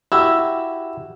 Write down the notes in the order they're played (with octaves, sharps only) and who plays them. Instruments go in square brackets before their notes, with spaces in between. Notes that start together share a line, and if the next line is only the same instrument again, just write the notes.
[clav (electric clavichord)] E4 F#4 G4 [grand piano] E6